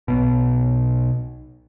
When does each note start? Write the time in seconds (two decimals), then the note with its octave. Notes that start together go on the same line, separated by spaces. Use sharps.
0.08 B1 B2